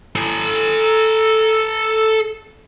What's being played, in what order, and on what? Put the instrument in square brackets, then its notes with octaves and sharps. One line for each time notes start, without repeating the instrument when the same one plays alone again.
[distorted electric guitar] A4 G#5